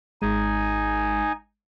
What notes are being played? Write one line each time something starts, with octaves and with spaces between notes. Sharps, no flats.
G#1 G#3 D#4 G#5